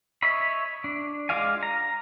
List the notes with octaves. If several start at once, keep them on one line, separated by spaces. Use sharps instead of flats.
C#5 D#5 E5 B5
D4
G#3 F4 D5 F5 G#5
A#5